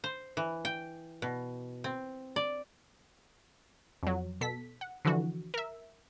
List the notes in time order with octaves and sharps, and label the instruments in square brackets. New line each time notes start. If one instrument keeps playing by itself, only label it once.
[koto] C5
E3
G5
B2
C4
D5
[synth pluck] F2 F#3
B2 A4 B6
F#5
D3 E3 F3 F#4
A#4 E5